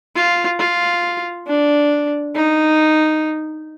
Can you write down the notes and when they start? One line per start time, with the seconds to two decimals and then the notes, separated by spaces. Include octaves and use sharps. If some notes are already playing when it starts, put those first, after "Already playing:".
0.16 F4
0.59 F4
1.47 D4
2.35 D#4